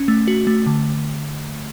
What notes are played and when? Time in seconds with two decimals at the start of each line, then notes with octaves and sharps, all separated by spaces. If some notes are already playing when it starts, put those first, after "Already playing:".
Already playing: C#4
0.08 A3
0.28 F#4
0.47 A3
0.66 D3